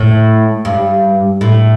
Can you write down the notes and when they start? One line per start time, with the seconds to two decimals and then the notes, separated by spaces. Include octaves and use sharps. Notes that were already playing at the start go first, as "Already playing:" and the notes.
Already playing: A2
0.65 G2
1.41 A2